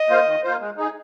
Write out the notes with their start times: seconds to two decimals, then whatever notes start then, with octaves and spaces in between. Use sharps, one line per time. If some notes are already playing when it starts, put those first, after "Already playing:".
Already playing: D#5
0.09 A#3 F4 C5
0.26 D#3
0.43 A#3 F4 C5
0.60 G#3
0.77 D#4 G#4